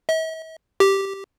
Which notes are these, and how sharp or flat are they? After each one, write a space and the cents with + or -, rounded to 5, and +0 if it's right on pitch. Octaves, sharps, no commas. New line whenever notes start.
E5 -45
G4 -5